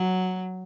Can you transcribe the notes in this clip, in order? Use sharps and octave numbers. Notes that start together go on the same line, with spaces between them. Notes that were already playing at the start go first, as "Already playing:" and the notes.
Already playing: F#3